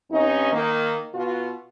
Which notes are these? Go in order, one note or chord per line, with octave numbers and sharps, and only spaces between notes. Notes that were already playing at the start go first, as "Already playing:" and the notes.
G2 C4 C#4 D#4
D#3 A#3
B2 F4 F#4